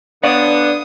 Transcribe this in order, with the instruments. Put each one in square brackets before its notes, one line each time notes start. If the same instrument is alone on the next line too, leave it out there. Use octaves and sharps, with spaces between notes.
[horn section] D3 B3 [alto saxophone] D4 [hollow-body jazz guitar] C#5 D5 F5 [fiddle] D#6